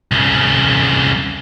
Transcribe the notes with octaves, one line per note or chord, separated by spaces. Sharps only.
C2 C#3